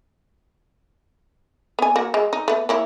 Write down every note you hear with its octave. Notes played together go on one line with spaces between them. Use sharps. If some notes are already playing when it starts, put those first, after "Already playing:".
B3 G#5
A#3 F#4
G#3
D#4
A3 B3
A#3 E4 C#5